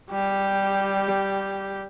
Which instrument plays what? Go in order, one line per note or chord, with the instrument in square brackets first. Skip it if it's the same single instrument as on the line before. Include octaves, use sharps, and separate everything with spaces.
[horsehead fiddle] G3 G4